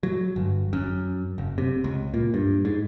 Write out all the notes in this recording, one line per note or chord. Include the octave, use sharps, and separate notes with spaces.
F#3
G1
F#2
F#1
C3
C#2
A#2
G2
G#2